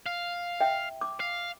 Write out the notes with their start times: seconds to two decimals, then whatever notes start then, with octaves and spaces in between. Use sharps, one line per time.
0.06 F5
0.60 E5 G5
1.01 D6
1.20 F5